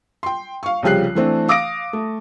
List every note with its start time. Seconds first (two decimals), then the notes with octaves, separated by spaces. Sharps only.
0.23 G5 C6
0.63 F5 C#6
0.83 C2 C#3 F3 G4 F#6 C7
1.15 E3 A3 C4 D4
1.48 F5 D6 D#6 A#6 D7
1.93 A3